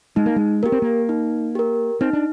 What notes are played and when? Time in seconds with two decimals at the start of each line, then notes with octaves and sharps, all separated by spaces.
0.16 G#3 D#4
0.26 A#3
0.36 G#3
0.63 A#3 G4 A#4
0.72 C4
0.82 A#3
1.09 D#4
1.55 G4 A#4
2.01 C4 D#4
2.13 D4